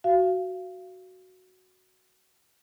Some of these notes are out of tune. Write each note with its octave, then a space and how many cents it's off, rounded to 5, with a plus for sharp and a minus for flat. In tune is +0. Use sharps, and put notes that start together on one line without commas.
F#4 +0 F5 -25